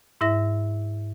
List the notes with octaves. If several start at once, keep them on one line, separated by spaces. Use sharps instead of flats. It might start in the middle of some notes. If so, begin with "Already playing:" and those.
G#2 E4 E5 A#6